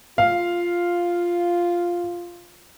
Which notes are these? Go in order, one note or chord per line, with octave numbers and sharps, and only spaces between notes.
F4 F5